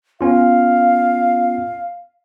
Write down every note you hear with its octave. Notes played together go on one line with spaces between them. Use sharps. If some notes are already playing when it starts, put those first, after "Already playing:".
B3 C#4 F4 F5